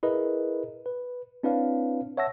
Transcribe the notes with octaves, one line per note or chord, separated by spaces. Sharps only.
E4 G#4 A#4 B4 D#5
B4
C4 D4 E4 B4 C#5 F5
C#5 E5 F#5 A5 E6 A#6